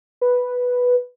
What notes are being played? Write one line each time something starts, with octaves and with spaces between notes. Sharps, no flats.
B4